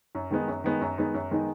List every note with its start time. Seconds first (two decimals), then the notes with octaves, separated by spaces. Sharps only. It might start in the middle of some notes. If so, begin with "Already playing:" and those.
0.15 F#2
0.31 D#3 G#3 B3 D#4
0.48 F#2
0.64 D#3 G#3 B3 D#4
0.81 F#2
0.98 D#3 G#3 B3 D#4
1.14 F#2
1.31 D#3 G#3 B3 D#4